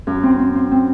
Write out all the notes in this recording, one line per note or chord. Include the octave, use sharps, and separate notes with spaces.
F#2
C4
C4
C4
C4